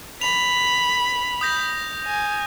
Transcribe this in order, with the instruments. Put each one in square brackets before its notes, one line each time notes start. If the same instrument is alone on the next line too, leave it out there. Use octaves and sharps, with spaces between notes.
[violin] B5 [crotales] F7
[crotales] D#6 G6 A#6
[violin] G#5